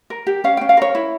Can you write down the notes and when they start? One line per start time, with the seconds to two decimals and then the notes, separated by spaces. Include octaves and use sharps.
0.10 A#4
0.27 G4
0.44 C#4 F5
0.57 C#4 G5
0.69 F5
0.77 A#4 C#5
0.95 E4